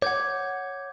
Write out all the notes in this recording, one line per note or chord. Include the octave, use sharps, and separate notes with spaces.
C#5 F#5 D6 G6 G#6